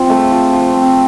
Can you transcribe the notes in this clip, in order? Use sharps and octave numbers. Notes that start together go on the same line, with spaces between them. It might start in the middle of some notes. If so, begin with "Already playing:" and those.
Already playing: F3 C4
A3
F3
F3
C4